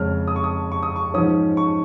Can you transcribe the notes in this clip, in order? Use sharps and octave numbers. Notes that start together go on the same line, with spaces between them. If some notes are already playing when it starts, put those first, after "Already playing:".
Already playing: F2 C#3 G#3 C#4 F6
D#6
C#6
D#6
C#6
D#6
C#6
G#2 F3 C#4 D#6
C#6